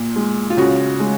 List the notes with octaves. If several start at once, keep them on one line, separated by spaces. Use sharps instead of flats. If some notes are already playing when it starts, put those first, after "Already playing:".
Already playing: A#2
G#3
F4
C#3 F#4
G#3